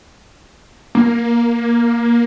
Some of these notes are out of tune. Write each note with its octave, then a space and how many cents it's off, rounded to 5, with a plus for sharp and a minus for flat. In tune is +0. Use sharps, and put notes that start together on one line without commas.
A#3 +10